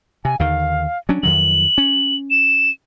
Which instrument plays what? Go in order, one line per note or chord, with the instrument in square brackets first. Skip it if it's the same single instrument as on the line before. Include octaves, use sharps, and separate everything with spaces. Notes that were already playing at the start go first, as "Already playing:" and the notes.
[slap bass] C3 [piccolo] G#5
[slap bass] D#2 D3 D#3 [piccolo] F5
[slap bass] F#3 C#4 D4
[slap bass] F2 D#3 F#3 [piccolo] F#7
[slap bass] C#4
[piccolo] E7